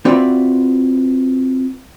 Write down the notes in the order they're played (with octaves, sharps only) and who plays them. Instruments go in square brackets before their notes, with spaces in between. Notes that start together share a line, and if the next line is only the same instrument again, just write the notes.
[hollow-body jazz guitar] C4 F4 F#4 B4 D5 E5